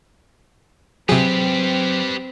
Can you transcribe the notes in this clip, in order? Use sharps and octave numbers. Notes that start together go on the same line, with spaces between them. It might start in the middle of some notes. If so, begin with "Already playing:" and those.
C3 F#3 C4 G4 G#4 B4